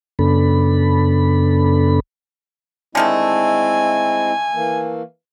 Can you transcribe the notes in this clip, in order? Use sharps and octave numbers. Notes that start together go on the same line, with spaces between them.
F#2 C#3 B3 D4 A4 B5
D3 D#3 G#3 A3 C4 E4 G#5
E3 A#3